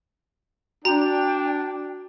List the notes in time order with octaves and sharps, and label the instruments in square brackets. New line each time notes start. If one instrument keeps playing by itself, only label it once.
[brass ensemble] D4 [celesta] F#4 [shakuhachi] G5 [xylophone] A#5